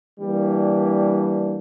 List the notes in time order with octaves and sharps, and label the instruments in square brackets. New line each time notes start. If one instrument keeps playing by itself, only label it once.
[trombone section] E3 G3 A#3 D4